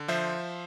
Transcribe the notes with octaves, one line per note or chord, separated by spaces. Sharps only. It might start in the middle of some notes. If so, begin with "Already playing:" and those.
Already playing: D3
F3 C5 E5